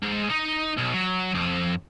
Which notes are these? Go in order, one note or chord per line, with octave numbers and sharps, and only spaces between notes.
G#2
D#4
B1
F#3
F2